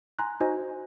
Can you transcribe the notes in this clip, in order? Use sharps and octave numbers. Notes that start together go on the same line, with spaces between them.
G#5 A#5 C6 F#6
D#4 F#4 C5 D#5 G#5